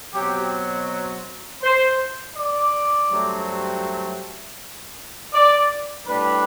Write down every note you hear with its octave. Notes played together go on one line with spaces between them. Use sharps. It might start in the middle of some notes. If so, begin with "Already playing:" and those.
B2 F#3 C4 G4
C5
D5
G2 F#3 A3 C4
D5
A2 G3 D4 B4